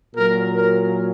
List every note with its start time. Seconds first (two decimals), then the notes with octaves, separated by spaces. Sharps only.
0.14 A#2 F#3 A#4
0.56 A#4